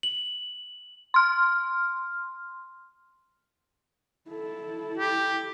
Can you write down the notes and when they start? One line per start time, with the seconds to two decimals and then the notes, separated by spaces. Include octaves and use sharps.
0.03 F#7
1.14 C6 F6
4.29 E4 A4
4.97 G4